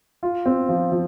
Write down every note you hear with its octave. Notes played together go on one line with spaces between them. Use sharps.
F4
C4
F3
F3